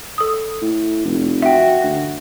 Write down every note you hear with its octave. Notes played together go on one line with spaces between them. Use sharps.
A4 D#6
A2
F1
F#4 E5 G5
D2